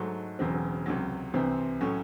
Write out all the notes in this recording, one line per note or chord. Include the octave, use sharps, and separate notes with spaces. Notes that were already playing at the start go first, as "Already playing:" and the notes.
Already playing: G#2 F#3 A3
E1 E2 C#3 F#3 C4
C#2 C3 F#3
C2 C3 E3 C4
A2 F#3 C#4